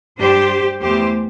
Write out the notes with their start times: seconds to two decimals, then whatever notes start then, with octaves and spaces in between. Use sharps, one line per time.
0.19 G2 G3 D4 G4 C5
0.82 E2 E3 A3 G4 C5